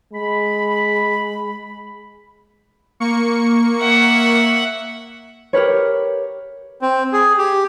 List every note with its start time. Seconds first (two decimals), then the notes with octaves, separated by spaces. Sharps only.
0.13 G#3 B5
3.00 A#3 C#6 C#7
3.80 E5 F#5
5.53 G4 A#4 B4 C#5
6.82 C4
7.13 G#4
7.38 G4